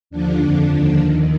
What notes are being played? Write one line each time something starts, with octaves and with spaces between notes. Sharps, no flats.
D#2 D3 F3 D4
F2 D3 F3 D4
D#2 D3 F3
D#2 D#3